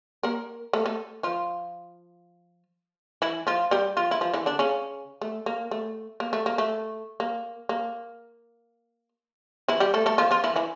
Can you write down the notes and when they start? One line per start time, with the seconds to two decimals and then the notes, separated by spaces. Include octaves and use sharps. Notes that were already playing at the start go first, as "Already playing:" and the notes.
0.23 A#3 A#4
0.73 A3 A4
0.86 A3 A4
1.23 F3 F4
3.22 E3 E4
3.47 F3 F4
3.71 G3 G4
3.97 F3 F4
4.11 E4
4.21 F3 F4
4.34 E3 E4
4.46 D3 D4
4.59 C#3 C#4
5.21 A3
5.46 A#3
5.71 A3
6.20 A#3
6.33 A3
6.46 A#3
6.58 A3
7.20 A#3
7.69 A#3
9.68 E3 E4
9.80 G3 G4
9.94 A3 A4
10.06 A3 A4
10.18 F3 F4
10.31 F3 F4
10.44 E3 E4
10.56 E3 E4